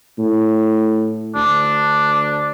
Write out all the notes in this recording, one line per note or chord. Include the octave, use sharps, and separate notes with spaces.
A2
D2 D4